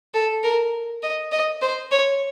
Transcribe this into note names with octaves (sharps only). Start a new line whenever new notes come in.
A4
A#4
D#5
D#5
C5
C#5